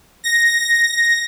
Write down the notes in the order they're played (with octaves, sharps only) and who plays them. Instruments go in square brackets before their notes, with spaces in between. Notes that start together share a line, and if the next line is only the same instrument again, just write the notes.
[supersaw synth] A#6